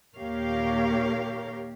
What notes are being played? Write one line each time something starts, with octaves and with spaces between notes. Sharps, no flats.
D#2 A#2 G4 A#4 C#5 F5